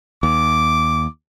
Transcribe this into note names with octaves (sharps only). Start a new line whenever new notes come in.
D#2 D6